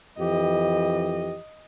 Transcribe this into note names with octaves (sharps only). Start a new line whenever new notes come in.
F2 E3 G4 D#5